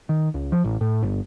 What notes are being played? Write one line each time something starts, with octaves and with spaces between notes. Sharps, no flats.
D#3
C#2
F3
A1
A2
G1